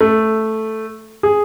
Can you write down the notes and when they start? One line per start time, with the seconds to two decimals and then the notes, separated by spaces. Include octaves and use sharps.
0.01 A3
1.23 G#4